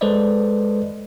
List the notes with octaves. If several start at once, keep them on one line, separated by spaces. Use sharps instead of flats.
G#3 A4 B4 C5 D5 D#5